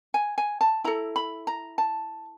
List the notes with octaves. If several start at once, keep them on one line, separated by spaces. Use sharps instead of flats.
G#5
G#5
A5
E4 A4 A#5
B5
A#5
A5